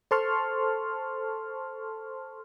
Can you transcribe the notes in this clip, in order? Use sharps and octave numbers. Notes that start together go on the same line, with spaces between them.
A4 C5 A5 C6 C#6 F6